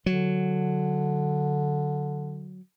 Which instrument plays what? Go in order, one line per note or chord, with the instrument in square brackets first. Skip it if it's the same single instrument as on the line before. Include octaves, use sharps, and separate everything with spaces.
[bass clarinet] D3 [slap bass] F#3